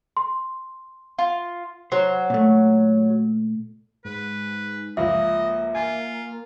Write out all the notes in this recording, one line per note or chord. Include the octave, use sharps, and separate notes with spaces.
C6
F4
F#3 C5
A#2 A3
G#2 B4
C#2 F3 A#3 D#5 E5
F4 G#5